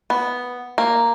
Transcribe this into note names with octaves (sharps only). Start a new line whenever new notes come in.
B3
A#3